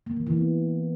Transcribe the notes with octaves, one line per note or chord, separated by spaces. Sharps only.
A#3
E3
E3
B3